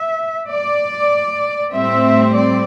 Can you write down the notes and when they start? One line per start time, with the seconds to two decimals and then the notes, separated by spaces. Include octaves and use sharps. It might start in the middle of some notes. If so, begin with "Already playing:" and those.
Already playing: E5
0.49 D5
1.73 A2 G3 C4 E5
2.35 D5